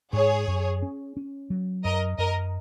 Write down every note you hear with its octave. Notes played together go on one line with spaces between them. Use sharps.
G#2 G#4 C#5
F#2
C#4
C#4
F#3
F#2 A#4 D#5
F#2 A#4 D#5